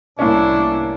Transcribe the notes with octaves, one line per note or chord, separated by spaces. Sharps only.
C2 A2 A#3 C#4 D4 E4